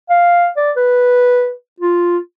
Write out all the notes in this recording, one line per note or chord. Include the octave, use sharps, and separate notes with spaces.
F5
D5
B4
F4